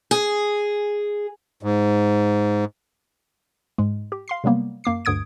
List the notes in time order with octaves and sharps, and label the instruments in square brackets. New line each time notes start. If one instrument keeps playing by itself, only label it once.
[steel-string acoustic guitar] G#4
[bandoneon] G#2
[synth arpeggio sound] G#2 G#3
G4
F5 C6 C7
C3 F#3 G3 A#3 B3
F#2 A#3 D6 C7
D2 G2 D3 D#6 G#6 D7